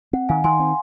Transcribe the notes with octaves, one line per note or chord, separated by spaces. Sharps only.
C4 F#5
D#3 F5 G#5
D#3 G#5 C6
C4